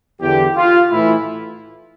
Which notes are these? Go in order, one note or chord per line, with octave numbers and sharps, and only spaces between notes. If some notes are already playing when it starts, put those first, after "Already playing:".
E2 D3 G4
F4
A2 E3 E4